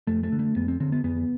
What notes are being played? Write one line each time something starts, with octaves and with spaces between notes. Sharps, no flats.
F2 A3
A3
D3
A3
F2 B3
C4
D3 C4
B3
F2 B3